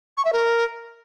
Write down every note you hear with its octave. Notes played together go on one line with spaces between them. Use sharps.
C#6
E5
A#4